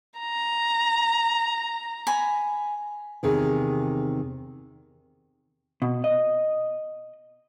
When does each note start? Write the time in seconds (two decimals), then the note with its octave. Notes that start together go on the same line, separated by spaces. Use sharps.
0.19 A#5
2.07 G#5 B5
3.23 E2 C3 D#3 G#4
5.82 B2
6.04 D#5